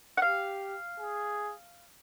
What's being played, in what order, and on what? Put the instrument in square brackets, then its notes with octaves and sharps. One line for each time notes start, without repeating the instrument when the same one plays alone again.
[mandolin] F#5
[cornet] G4 [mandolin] F5
[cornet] G#4